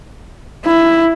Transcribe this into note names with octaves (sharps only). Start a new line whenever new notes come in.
E4